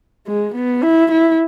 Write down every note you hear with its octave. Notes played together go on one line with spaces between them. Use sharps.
G#3
B3
E4
E4